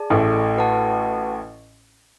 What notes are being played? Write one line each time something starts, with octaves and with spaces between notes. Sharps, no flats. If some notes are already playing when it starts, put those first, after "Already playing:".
Already playing: G#4 D5 A5
A1 A2
F#4 B4 F#5 A5